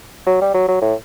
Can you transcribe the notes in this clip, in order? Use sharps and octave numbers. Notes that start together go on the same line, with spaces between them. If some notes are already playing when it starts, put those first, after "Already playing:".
F#3
G3
F#3
F#3
A2